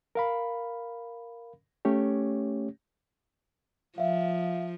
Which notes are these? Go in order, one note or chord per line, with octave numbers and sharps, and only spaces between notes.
A#4 F5 B5
A3 C#4 G4 C#5
F3 E5 F5